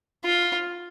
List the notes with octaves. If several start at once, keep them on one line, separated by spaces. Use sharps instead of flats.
F4